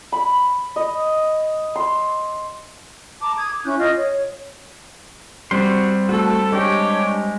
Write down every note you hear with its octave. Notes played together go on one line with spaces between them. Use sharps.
B5
D#5
C6
A5 A#5 D6
D#6 G#6
D6
C#4 E4 F#6 G6
F4 D#5
C#5
G3 C4 F#4 C6
A3 F#4 A4
G#3 D4 G4 C#5